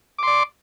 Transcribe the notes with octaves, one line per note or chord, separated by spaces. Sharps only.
D5 C6 D6